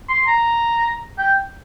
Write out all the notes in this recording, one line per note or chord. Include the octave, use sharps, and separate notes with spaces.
C6
A#5
G5